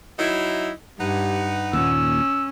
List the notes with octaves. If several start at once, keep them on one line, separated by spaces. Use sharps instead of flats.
F#3 D#4 E4
G2 D#4 G4 B4 F#5
D#2 A#2 C#4 E6